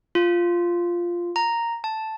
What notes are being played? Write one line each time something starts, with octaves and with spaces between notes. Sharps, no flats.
F4
A#5
A5